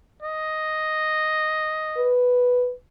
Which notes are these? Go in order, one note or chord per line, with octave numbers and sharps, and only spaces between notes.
D#5
B4